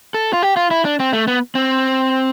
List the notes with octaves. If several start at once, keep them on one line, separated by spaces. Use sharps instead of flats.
A4
F4
G4
F4
E4
D4
C4
A3
B3
C4